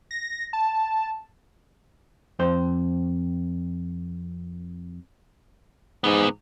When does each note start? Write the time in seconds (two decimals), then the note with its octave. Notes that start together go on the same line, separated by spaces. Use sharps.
0.11 A#6
0.53 A5
2.39 F2 C5
6.04 E2 G#2 B3